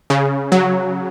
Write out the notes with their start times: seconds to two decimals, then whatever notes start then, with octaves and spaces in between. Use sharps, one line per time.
0.10 C#3
0.52 F#3